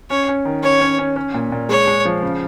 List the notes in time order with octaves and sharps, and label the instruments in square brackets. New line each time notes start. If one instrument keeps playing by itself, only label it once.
[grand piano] C#4 [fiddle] C#5
[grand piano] C#4
D#3
[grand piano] C#4 [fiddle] C#5
[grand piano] C#4
C#4
C#4
A#2
A#2
[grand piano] G#3 [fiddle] C#5
[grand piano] G#3
F3
C#3